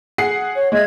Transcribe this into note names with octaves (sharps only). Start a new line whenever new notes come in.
G#4 F#5 C7
C#5
G#3 D#5 E5 G#6